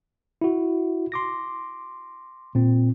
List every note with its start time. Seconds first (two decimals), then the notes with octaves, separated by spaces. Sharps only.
0.42 E4 F#4
1.12 C6 D6 A#6
2.55 A#2 C4